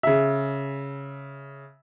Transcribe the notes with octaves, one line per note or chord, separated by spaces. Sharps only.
C#3 E5